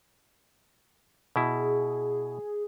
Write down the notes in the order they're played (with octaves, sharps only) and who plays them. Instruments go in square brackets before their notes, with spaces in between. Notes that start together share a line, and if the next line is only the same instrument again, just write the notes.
[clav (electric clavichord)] B2 E4 [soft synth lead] G#4